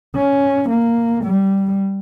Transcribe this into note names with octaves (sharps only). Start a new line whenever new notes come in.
C#4
A#3
G3